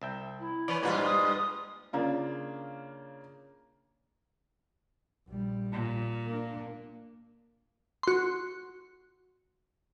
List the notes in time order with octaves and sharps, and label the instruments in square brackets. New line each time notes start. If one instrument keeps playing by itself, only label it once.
[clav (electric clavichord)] C2 E5 G5
[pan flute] E4
[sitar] E3 [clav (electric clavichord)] B4 C#5 D5
[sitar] G2 F4 B4 [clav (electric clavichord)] A#2 [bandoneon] G3 G#3
[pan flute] D#6
[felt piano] C#3 A#3 D4 F4
[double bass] A#1 G3
[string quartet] A#2
[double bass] A#3 D4
[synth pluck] F#4 C6